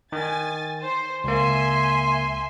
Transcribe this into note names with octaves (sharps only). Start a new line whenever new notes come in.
D#3 G#5 A6
C5
C#2 A#3 E5 G#5 C6